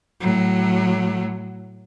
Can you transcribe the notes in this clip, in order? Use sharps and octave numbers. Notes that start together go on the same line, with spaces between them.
A2 F#3